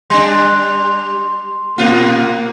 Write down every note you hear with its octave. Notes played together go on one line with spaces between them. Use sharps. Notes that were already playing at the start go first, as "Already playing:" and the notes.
G3 D4 C6
A#2 A#3 F4